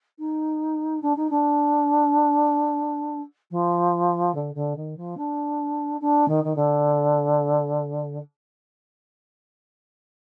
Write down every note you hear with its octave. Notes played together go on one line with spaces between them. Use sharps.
D#4
D4
D#4
D4
F3
D3
D3
D#3
F3
D4
D4
D#3
D#3
D3